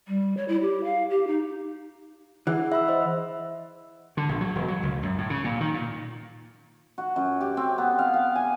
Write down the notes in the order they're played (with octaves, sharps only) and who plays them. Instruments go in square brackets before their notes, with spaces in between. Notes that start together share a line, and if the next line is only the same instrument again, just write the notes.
[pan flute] G3
C#5
E4
G4
F5
G4
D#4
[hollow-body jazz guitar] E3 [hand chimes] G#4 F#5
[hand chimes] E5 B5 E6
C5 D#5 F#5
[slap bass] D3
A#1
F#3
E1
F#3
C#2
F#2
A2
C#3
A#2
D#3
A#2
[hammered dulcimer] F#4
F#2
G4
C4
B3
F5
F5
G#5